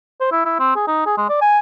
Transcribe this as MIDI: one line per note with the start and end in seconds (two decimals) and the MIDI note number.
0.20 0.29 72
0.32 0.42 64
0.45 0.59 64
0.59 0.75 60
0.76 0.83 68
0.87 1.03 63
1.06 1.14 68
1.17 1.28 56
1.29 1.39 74
1.41 1.59 80